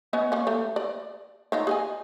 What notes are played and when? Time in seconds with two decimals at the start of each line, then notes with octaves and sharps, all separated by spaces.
0.13 B3 C#4 D#5
0.32 A#3 C#4
0.47 A3
0.76 D5
1.52 D#3 D#4 F4
1.67 G#4 D#5 G#5